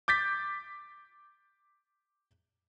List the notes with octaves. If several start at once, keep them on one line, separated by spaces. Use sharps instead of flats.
D6 G6 A6 B6